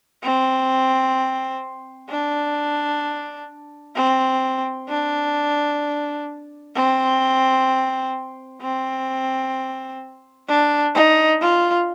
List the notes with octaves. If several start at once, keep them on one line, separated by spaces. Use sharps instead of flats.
C4
D4
C4
D4
C4
C4
D4
D#4
F4